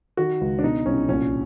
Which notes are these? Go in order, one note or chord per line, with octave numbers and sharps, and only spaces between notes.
D#3 F#4
C#2
D4
B2 D#4
C2 C#4
A#1 C#4